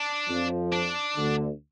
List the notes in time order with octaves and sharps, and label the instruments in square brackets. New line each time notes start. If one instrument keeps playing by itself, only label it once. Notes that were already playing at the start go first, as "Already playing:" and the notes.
Already playing: [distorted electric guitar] D4
[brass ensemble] F2 F3
[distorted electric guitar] D4
[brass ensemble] D2 D3